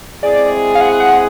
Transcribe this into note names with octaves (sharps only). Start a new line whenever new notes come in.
G#3 C4 E4 G#4 D5
F5
F#5
F#5